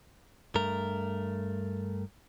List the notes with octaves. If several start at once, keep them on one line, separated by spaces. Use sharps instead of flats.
G2 A3 A#4